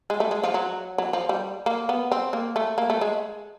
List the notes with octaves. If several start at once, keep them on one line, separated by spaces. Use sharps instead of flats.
G#3
A3
G#3
F3
F#3
F#3
F3
G3
A#3
B3
C4
A#3
A3
A#3
A3
G#3